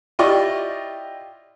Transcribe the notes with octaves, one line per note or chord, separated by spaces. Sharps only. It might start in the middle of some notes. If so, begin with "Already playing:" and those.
E4 F4 G4 D5 D#5 C#6